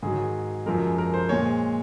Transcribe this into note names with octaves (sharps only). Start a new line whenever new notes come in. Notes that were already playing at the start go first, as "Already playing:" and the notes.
G#2 D#3 F#3 G#4
F#2 F3 G#3 A#4
A#4
C5
A#2 G#3 C#5